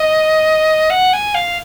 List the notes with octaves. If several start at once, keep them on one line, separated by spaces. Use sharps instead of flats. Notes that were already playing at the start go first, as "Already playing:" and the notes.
Already playing: D#5
F#5
G#5
F5